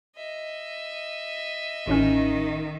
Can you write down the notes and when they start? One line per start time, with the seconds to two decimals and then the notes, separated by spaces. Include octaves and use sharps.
0.16 D#5 E5
1.87 A1 A2 D#3 C#4